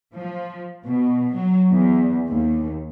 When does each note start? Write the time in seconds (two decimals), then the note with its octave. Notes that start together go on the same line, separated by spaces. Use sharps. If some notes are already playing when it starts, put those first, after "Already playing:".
0.15 F3
0.85 B2
1.34 F#3
1.70 E2
2.28 D#2